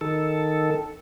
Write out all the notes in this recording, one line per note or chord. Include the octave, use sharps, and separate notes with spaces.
D#3 A4